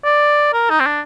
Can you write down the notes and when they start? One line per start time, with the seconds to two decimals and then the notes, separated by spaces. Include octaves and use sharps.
0.05 D5
0.53 A#4
0.70 D#4
0.80 C4
0.86 D4